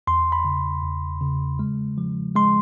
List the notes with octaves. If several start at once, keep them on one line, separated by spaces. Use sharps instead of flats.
E2 C6
B5
C#3
E2
C#3
G#3
F3
G#3 C6